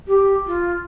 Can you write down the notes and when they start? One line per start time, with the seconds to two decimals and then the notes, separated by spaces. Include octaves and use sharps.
0.07 G4
0.47 F4